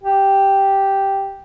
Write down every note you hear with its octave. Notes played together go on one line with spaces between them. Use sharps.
G4